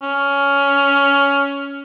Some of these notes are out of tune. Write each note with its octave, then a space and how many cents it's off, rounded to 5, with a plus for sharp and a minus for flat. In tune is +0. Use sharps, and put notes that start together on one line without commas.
C#4 +15